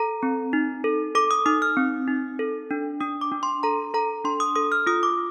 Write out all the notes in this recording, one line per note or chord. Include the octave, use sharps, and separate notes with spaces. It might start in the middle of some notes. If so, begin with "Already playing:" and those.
Already playing: A4 A#5
C4
D#4
A4
A4 D6
D#6
D#4 D#6
F6
C4
D#4
A4
D4
D4 D#6
D6
D4
C6
A4 A#5
A4 A#5
D4 C6
D#6
A4 D#6
F6
F4 D#6
D6